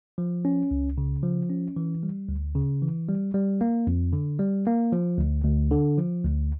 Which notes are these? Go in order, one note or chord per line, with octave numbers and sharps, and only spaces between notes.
F3
C#4
C#2
C#3
F3
C#4
E3
G3
D2
C#3
E3
G3
G3
A#3
F2
D3
G3
A#3
F3
D2
D2
D3
F3
D2